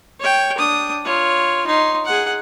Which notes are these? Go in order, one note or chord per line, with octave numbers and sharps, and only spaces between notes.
C#5 G5
D4 D#6
F4 C#5
D#4 C6
G#4 F#5